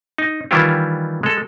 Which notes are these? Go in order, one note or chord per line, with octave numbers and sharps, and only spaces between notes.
D#4
D#3 E3 G3 E4 F4 G4
G#3 A4